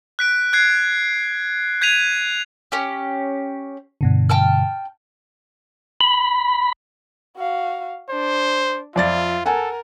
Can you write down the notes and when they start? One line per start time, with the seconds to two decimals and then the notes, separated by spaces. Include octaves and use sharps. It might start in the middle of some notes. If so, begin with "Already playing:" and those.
0.19 F#6 B6 D7
0.53 F#6 G#6 C7
1.81 G6 G#6 B6 D#7 F7
2.72 C#4 G4
4.01 G2 B2 D3
4.29 G5 A5 F6
6.01 B5
7.37 F#4 F5
8.10 D4 C5
8.96 F2 F4 D5 E5 A6
9.46 A4 A#4 F#5 G#5